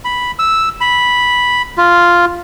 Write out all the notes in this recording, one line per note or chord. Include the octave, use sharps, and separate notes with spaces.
B5
E6
B5
F4